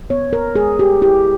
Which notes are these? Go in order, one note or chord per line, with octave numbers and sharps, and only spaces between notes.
B3 C#5
A#4
G#3 G#4
G4
E4 G4